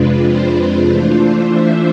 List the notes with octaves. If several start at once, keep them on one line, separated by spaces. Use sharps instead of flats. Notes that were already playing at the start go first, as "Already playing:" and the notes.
Already playing: F2 C3 G#3 D4 F4 B4
C5
E3 A3 D4 F4
E5